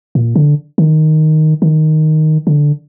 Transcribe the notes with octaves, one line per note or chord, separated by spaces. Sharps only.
A#2
D3
D#3
D#3
D3